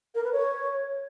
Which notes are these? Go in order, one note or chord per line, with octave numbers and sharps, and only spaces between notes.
A#4
B4
C#5